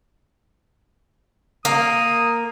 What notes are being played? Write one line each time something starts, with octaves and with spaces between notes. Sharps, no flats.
A#3 D#6